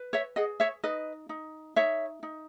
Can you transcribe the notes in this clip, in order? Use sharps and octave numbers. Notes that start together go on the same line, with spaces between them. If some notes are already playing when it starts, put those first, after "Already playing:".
Already playing: B4
C#5 E5
G#4 D#5 F#5
C#5 E5
D#4 B4 D#5
D#4
D#4 C#5 E5
D#4